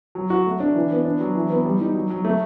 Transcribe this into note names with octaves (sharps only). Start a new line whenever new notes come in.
F#3
F#4
A3
D4
E3
B3
D4
F#3
E3
B3
G3
D#4
F#3
F#3
A3